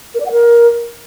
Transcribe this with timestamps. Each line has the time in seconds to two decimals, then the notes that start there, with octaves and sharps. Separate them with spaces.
0.15 A#4
0.20 D5
0.26 F#5
0.32 A#4